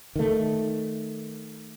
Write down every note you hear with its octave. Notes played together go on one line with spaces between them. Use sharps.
D#3 A3